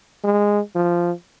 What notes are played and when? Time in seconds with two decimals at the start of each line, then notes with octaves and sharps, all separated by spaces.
0.24 G#3
0.75 F3